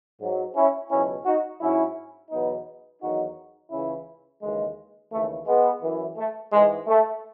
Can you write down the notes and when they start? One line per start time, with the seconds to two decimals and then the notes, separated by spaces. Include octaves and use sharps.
0.20 G#2 F#3
0.55 C#4 E4
0.90 C#2 B2 F#3 C#4 E4
1.25 D#4 F#4
1.60 G#2 F#3 C#4 E4
2.30 E2 B2 F#3 B3 D#4
3.01 E2 D#3 F#3 D#4 F#4
3.71 C#2 C#3 E3 C#4 E4
4.41 D#2 C#3 E3 G#3
5.12 D#2 C#3 E3 A3
5.47 G#3 B3
5.82 F#2 E3
6.17 A3
6.53 G#2 E3 G#3
6.88 A3